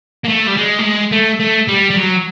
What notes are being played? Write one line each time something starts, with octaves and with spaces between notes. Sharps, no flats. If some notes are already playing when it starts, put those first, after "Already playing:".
A#3
A3
G3
G#3
A3
G#3
A3
A3
G3
G3
F#3